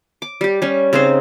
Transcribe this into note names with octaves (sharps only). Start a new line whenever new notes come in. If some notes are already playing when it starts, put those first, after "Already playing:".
D6
G3 G4
G3 C#4
C#3 C4 D#4 C5